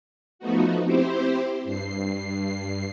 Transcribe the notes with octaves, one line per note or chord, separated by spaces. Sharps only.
F3 A3 B3 D#4 F#4
C4 E4 G4 C5
G2 C7